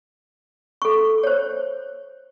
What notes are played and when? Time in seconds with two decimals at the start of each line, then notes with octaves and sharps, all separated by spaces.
0.82 A4 C#6
1.23 C5 C#5